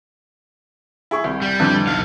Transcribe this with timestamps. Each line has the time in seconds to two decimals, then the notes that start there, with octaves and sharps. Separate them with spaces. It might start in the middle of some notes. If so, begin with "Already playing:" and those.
1.11 E4 G#4 C#6
1.24 C2
1.42 G3
1.59 F2 D3 E3
1.87 B1 F5